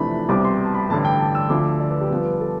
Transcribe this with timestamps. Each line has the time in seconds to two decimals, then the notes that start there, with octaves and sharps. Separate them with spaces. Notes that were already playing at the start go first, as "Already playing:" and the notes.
Already playing: F2 C3 E3 A3 D4 B5
0.29 C2 B2 G3 C4 D6
0.45 C6
0.65 A5
0.74 B5
0.90 A1 G2 D3 A5
1.05 G5
1.20 A5
1.35 E6
1.49 D2 D3 F3 D6
1.80 D5
1.90 B4
2.01 G4
2.10 G2 F3 B3
2.40 A4